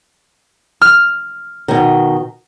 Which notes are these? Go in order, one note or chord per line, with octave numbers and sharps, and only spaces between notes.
F6
B2 D#3